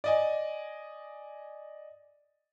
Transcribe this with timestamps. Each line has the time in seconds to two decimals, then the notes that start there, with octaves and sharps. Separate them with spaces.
0.04 D5 D#5 G#5